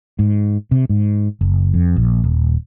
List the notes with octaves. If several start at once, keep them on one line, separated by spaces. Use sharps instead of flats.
G#2
C3
G#2
F#1
F2
A#1
D#1